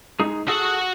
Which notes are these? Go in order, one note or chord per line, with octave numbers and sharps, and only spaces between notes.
G#3 D#4 G#4
F#4 G#4 A4 F#5